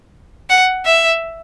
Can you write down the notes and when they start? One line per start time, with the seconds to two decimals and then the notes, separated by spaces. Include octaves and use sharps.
0.50 F#5
0.85 E5